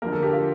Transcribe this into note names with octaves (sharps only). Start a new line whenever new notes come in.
D3 F3 A#3 A#4
A4
G4
F4